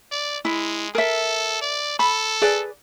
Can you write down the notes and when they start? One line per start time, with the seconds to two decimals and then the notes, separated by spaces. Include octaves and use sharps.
0.11 D5
0.45 G#3 E4
0.95 A4 A#4 E5
1.62 D5
1.99 A4 B5
2.42 G#4 B4 D5